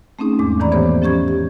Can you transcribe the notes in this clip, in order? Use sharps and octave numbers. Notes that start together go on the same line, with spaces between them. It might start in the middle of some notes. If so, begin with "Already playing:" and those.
A3 C4 C#4 D#4 G#4
E2 G#2 G#3 D6
A2 D#3 E3 D5 A#5 B5
E3 A#3 B3 G4 C5 C#5
F3 C#4 G4 C#6 G#6
G4